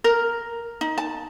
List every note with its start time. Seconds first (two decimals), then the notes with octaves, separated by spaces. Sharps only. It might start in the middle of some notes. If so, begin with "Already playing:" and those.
0.04 A#4
0.81 D#4
0.98 A5